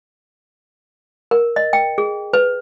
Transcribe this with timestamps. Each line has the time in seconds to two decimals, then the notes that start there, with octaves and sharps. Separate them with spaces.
1.31 A#4
1.56 D#5
1.73 G5
1.98 G#4
2.33 B4